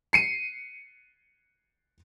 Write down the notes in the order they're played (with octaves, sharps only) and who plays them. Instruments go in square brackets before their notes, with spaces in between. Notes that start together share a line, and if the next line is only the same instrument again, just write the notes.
[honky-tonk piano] C7 C#7 D#7